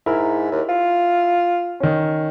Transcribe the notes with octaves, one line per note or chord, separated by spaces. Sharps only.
G#2 E4 A#4
D#2
F4
D#3 C#4